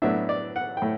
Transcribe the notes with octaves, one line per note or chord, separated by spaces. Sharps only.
A2 F#3 B3 D4 E5
D5
F#5
G5
A2